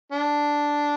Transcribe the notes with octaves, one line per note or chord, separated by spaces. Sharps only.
D4